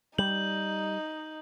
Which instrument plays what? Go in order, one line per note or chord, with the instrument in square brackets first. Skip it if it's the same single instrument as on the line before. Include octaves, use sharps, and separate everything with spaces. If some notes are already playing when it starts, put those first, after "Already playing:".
[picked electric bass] G3 [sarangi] D#4 [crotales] G6 [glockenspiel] F#7